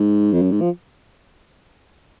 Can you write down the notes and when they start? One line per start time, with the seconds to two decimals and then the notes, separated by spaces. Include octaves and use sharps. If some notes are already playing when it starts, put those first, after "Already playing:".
Already playing: G#2
0.33 F2
0.42 F#2
0.52 G#2
0.61 F3